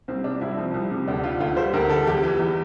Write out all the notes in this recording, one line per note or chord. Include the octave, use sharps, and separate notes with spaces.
C2 C4
C3 D4
C2 E4
F3 C4
C2
C3
D2 D4
D3 F4
D2 F4
G3 C5
D2 A#4
D3 A4
E2 G4
E3
E2